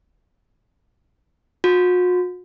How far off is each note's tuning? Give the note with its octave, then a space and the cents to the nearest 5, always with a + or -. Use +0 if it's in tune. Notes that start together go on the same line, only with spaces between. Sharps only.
F#4 -45